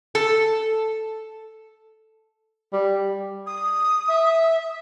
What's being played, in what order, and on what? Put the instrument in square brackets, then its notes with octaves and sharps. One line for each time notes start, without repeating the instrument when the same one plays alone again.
[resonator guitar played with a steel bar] A4
[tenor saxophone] G3
[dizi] D#6
[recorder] E5